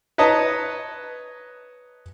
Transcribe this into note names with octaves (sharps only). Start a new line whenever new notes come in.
B4 C#5 D#5 A5 A#5